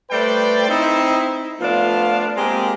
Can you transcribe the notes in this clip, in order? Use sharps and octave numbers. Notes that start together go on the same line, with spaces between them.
G3 A3 B4 C5 D5 G5
C4 D#4 E4
F3 A3 B3 D4 F4 F5
G#3 A#3 C4 G4 G#4 A#4